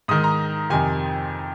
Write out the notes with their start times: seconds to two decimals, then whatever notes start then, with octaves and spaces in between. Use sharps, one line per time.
0.08 G#2 D#3 D#6
0.24 A#5
0.70 F2 C3 D#3 G#5